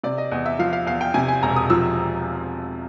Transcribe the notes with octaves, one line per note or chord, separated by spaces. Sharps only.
C3 D5
D#5
E2 D#5
E5
F3 F5
F5
E2 F5
G5
C3 G#5
G#5
E1 A#5
D#6
F3 E6